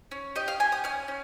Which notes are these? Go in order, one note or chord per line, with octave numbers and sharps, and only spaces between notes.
C#4
G4 D#5
F5
G4 G#5
D#6
C#4 F6
C#4